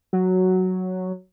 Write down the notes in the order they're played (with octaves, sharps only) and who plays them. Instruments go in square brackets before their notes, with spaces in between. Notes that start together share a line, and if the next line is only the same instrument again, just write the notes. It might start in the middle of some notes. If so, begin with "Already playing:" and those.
[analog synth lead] F#3